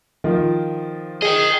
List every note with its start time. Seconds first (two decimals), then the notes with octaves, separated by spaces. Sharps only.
0.24 D#3 F3 F4
1.22 G#4 D#5 G5